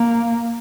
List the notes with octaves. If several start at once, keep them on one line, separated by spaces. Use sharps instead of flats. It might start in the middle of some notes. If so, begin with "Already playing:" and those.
Already playing: A#3